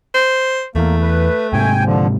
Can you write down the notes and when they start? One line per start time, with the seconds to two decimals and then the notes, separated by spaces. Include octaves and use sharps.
0.14 C5
0.76 E2 E3 A3 A#3
1.02 B4
1.53 G#2 C3 G5 G#5
1.85 D3 F3